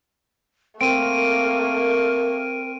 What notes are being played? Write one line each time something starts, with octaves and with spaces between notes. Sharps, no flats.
A3 A#3 C4 A#4 D7 D#7